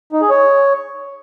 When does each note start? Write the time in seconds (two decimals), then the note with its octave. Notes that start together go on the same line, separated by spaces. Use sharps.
0.12 D#4
0.21 G#4
0.30 C#5